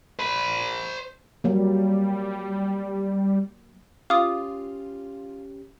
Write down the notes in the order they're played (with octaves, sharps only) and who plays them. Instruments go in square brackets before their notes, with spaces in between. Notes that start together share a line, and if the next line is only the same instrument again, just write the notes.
[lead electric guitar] C5 B5
[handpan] F#3 A#3 [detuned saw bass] G3
[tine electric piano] C#4 G4 [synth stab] F4 [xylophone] D6 D#6